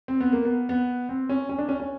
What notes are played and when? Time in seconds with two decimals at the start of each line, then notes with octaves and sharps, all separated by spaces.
0.08 C4
0.20 B3
0.33 A#3
0.45 B3
0.69 B3
1.09 C4
1.29 C#4
1.49 C#4
1.59 D4
1.69 C#4
1.80 C#4